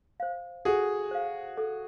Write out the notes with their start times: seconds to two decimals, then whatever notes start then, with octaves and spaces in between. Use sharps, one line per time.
0.20 C5 F5
0.65 F#4 G#4 A4
1.11 C5 F5
1.57 A4